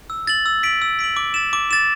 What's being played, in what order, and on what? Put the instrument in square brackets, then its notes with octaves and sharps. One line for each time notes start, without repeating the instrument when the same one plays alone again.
[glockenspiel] E6
A6 F#7
E6
B6 D7 F#7
E6
B6 D7 F#7
D6
A6 E7
D6
A6 E7